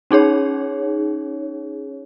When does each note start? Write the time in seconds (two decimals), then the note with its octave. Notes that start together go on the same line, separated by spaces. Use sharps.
0.11 C#4 D#4 G#4 C#5